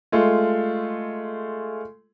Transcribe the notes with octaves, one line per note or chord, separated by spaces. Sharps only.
G#3 A3 F4